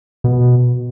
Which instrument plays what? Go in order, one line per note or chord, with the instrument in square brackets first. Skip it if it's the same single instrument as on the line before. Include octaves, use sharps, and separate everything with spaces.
[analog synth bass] B2